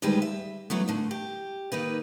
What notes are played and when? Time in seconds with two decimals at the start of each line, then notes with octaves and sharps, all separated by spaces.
0.02 D2 D#3 G3 G#3 G4 B4
0.22 E5
0.70 E3 F#3 A3 B3
0.88 A#2 D3 A3
1.11 G4
1.72 D#3 A#3 D#4 B4